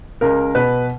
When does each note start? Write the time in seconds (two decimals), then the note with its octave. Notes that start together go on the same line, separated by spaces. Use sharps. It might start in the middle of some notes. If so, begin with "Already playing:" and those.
0.21 C#2 A#4
0.55 B2 B4